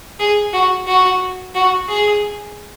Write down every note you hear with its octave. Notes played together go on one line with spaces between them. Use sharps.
G#4
F#4
F#4
F#4
G#4